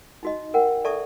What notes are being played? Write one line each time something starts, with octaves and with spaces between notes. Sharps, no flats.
D#4 F#4 D#5
A#4 F#5 G5
A4 D5 E5 A5 C#6 D#6